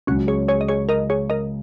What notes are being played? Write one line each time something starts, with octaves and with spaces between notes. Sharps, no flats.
C#2 C#3 F#3 C#4 F#4
G#4 C#5
G#4 C#5
D#5
G#4 C#5
A#4 D#5
G#4 C#5
A#4 D#5